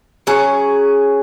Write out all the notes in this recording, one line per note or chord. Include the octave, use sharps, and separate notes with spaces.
F#3 C#4 G#4